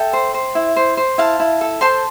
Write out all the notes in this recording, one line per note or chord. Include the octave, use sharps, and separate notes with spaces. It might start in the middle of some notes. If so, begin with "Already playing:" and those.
Already playing: A4 E5 G5
C5
C5
E4
C5
C5
E4 F5 A5
E4
A4
C5 A5 C6